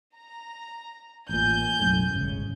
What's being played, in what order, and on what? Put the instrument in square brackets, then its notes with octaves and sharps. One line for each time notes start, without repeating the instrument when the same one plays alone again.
[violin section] A#5
[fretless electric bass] A1 A#2 [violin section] G#5 G6
[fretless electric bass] B1 F#2 A2
D#1 G#1 C#3